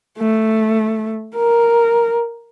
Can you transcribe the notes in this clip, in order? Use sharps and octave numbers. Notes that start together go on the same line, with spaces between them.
A3
A#4